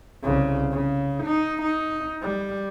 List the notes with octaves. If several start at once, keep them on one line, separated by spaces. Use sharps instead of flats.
C2 C#3
C#3
D#4
D#4
G3